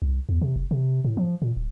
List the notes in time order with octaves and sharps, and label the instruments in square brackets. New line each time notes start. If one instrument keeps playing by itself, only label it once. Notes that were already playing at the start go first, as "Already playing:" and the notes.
[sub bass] C2
E2
C3
F1
C3
A2
F3
A#2
D1